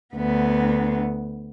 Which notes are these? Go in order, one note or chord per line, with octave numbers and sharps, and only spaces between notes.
D2 B3